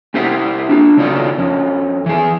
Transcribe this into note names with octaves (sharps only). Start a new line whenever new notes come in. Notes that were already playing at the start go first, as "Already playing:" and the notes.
C4 E4 G4 C5 E5 F#5
D4 F4
C#3 F#3 C4 D#4 F4 D5
F2 C#4
E3 G#4